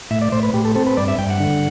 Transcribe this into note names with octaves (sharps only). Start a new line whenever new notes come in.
A2 E5
D5
A2 C5
B4
A2 G4
A4
C4 A4
B4
G2 D5
E5
G2 G5
F#5
D3